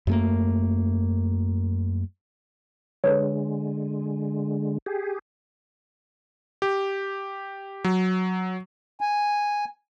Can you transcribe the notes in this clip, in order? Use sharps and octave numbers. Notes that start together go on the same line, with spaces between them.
F#2 A3 A#3
D3 G#3 A4 B4 C#5
G4 G#4
G4
F#3
G#5